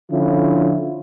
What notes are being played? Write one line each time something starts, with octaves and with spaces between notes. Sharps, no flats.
D3 F3 C#4 E4 F4